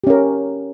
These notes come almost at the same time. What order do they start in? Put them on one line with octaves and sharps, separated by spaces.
G4 C#4 A#4